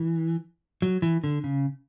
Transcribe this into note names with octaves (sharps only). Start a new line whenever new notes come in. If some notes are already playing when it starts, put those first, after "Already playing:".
Already playing: E3
F#3
E3
D3
C#3